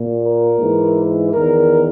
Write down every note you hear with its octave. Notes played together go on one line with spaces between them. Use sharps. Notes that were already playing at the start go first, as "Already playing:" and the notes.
Already playing: A#2
A#4
G#2 E3
E2 D#3 A#4